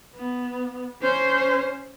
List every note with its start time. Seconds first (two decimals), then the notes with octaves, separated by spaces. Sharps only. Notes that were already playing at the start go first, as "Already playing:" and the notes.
0.15 B3
1.02 C#4 C5